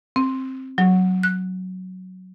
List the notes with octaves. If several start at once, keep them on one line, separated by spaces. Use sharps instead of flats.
C4
F#3
F#6